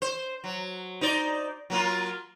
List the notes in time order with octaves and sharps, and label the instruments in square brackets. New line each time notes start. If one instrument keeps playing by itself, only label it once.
[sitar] C5
F#3
D#4 C5 D5
F#3 A#3 F4